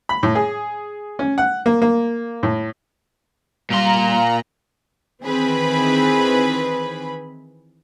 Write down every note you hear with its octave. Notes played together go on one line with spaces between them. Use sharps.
B5
A2
G#4
C#4
F#5
A#3
A#3
A2
A#2 G3 F5 A#5 C6
D#3 E3 C4 G#4 B4 B5